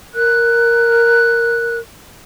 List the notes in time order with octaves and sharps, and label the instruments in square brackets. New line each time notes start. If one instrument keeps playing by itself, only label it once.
[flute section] A#4 F#6